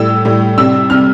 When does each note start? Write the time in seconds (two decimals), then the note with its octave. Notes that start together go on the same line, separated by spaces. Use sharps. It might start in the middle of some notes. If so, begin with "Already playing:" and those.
Already playing: A2 G3 E6
0.25 A2 G3
0.58 C3 G3 E6
0.90 C3 G3 F6